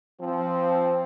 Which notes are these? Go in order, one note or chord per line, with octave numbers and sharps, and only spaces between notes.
F3 C4